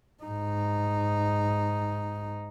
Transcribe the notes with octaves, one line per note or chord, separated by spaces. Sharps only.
G#2 D#4